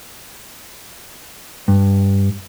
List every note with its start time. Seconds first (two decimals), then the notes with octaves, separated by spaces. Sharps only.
1.68 G2